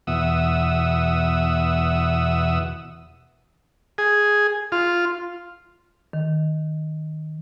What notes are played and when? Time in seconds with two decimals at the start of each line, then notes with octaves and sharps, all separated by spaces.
0.07 E2 B2 E5 F#5 D#6 E6
3.98 G#4
4.72 F4
6.13 D#3